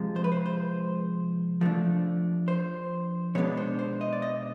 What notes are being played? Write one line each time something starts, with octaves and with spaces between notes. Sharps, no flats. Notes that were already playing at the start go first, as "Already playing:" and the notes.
Already playing: C3 F3 G#3
C5
B4
C5
C5
F3 A3 D4
C5
B2 G#3 B3 D4 C#5
C5
C5
D#5
D5
D#5